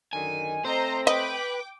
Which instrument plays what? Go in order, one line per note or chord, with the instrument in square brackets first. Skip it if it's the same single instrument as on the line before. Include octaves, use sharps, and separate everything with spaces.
[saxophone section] F#2 D3 D#3 [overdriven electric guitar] G#5
[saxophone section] A3 C4 [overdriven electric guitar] C5 [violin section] D#5 A#5
[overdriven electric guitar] B4 [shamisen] D#5 [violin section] G5 D6